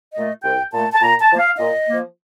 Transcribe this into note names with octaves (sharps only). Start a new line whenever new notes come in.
A#2 A3 D#5
C2 G5
A#2 A3 A5
A5
A#2 A#5
A5
F3 A#3 D#5
F5
A#2 D#5
F3 A#3